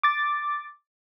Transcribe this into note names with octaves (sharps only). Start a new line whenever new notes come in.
D6 A6